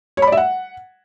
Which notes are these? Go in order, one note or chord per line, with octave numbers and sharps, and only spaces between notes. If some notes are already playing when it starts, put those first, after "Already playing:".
C#5
B5
D5
E5
F#5